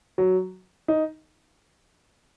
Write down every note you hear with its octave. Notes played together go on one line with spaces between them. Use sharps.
F#3
D#4